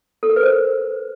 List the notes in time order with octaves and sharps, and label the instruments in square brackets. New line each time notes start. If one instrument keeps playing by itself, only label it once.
[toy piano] A4
A#4
B4
C5